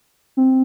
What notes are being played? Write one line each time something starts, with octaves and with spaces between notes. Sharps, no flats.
C4